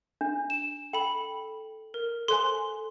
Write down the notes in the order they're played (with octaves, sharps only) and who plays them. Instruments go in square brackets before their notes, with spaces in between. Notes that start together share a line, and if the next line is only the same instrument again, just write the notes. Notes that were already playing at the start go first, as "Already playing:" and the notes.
[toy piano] D4
[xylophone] E7
[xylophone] A4 B5 [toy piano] G5
[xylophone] A#4
[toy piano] A4 C5 G#5 [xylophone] C6